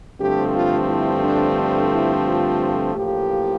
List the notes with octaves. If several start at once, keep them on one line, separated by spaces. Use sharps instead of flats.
G2 D3 F3 A3 C4 G4
F4
E4
D4
D4
E4
F4
A1 A2 F3 A#3 G4